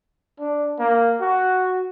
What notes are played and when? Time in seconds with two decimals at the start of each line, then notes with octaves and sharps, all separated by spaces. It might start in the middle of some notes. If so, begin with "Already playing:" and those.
0.40 D4
0.79 A#3
1.21 F#4